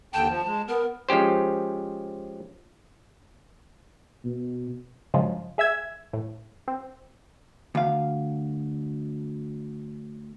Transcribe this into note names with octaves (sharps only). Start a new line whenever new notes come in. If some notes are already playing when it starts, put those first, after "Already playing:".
D#2 D3 G5 A5
F3
G#3
B3 A#4
F3 G#3 C#4 G4 C5
B2
G2 C#3 F3 F#3 G#3
G#4 E5 E6 G#6
A2
C4
D2 F5